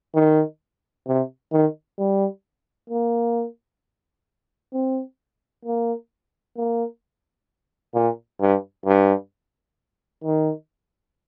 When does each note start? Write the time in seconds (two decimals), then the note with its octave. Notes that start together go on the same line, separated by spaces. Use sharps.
0.14 D#3
1.07 C3
1.52 D#3
1.99 G3
2.90 A#3
4.73 C4
5.65 A#3
6.57 A#3
7.95 A#2
8.41 G2
8.86 G2
10.24 D#3